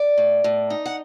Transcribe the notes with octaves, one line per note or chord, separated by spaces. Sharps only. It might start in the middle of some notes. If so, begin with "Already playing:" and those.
Already playing: D5
A2
A2
D#4
F#5